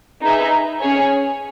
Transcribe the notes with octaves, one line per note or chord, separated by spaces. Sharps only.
D#4 G#4 B4 E5
C#4 G#4 C#5 G#5